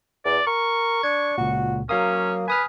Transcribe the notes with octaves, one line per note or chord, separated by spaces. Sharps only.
E2 D5
A#4 C#6
D4 G#6
C#2 A#2 F#4
F#3 A#3 C#4 F5 D#6
B4 G#5 D#6 F6